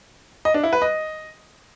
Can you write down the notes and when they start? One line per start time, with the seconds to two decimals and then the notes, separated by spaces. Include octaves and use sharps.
0.45 D#5
0.54 D4
0.63 E4
0.73 B4
0.82 D#5